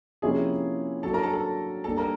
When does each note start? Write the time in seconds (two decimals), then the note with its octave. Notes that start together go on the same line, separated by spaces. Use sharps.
0.22 C3 F3 A#3 C#4 E4 G#4 G#5
1.03 F#3 A#3 D4 A4 A5
1.13 A#4 A#5
1.23 A4 A5
1.34 A4 A5
1.84 G3 A#3 D4 A4 A5
1.98 A#4 A#5